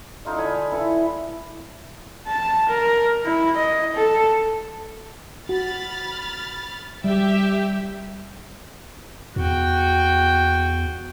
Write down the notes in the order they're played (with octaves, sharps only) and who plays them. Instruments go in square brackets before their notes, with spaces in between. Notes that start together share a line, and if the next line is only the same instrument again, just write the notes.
[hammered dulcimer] D#4 F4 A4 D#5
D3 G#5 B5
E4 A4 B4
[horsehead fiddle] A5
A#4
E4
D#5
A4
[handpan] F#4 [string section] B5 F6 A6
[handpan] G3 [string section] G4 E5 G5
[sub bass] E2 [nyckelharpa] F#4 G5